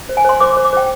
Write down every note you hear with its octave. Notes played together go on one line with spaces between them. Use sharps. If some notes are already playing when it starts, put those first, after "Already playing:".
C5
G#5
C5 C6
C5 D6
D6
C5
D6
C5 G5